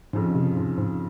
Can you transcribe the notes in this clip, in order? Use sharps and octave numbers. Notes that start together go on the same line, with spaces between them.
F2 G#2 C#3 F3
C3
G#2
G#2